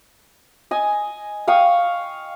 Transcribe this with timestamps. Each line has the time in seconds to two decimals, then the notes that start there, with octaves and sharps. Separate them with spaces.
0.71 D#5 G#5
1.48 F5 G5 C#6 D#6